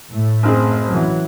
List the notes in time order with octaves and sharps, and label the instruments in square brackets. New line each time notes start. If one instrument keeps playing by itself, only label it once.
[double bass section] A2 A3
[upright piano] F#1 C4 G#4
[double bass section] E3 F#3